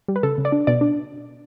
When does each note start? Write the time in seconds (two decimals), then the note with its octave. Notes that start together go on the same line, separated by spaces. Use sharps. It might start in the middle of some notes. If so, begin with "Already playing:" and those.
0.08 G3
0.16 B4
0.23 C#3 A4
0.38 C#3
0.45 D5
0.52 D4
0.67 B2 D5
0.81 D4